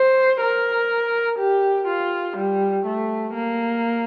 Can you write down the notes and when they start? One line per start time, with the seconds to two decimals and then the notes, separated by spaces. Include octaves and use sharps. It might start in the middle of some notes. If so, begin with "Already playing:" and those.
Already playing: C5
0.41 A#4
1.38 G4
1.87 F4
2.37 G3
2.86 A3
3.33 A#3